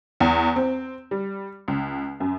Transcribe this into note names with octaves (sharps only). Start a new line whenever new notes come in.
E2
C4
G3
C#2
F#2